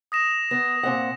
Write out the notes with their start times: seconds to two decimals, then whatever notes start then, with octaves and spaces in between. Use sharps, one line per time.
0.12 D#6 A#6 E7
0.51 B3 A#6
0.83 A#2 C4 F#5